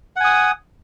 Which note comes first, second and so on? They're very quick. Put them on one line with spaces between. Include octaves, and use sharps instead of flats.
F#5 G#5 D#6